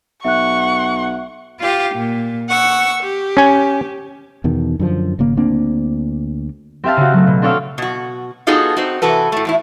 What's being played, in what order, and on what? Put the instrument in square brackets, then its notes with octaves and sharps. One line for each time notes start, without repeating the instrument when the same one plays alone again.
[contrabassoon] B1 [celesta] E5 F#6 [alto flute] F#5 [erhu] C#6
[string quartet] F4 G4
A#2
F#5 C#6 E6
G4
[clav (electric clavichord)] C#4 G#5
[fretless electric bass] E2 B2 D#3
F#2 D3 E3 F3
G#1 C#3 A#3
D2 A#3 C4 D4
[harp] C4 G4 E5 F5 A5
C#3 F#4
F#3 A3
B2
C4 D4 A4 C#5 F5 E6
[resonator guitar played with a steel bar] B2 F#4
B3 D#4 F4 F#4 G#4 A4
C4 D#4 F#4
C3 E3 F#4 A4 B4
A2 A3
E2 A2 E4